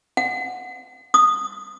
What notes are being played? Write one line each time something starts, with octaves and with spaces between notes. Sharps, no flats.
F#5
D#6